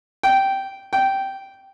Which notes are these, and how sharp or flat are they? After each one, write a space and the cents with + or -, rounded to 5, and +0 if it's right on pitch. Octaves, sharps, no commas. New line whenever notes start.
G5 -10
G5 -10